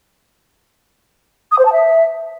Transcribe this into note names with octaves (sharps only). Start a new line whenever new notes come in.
D#6
C5
A5
E5